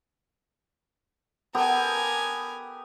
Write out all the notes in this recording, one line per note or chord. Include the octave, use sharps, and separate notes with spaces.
B3 G4 A4 A#4 G#5